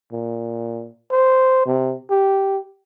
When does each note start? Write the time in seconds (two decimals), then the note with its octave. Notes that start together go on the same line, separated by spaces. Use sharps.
0.12 A#2
1.11 C5
1.66 C3
2.10 G4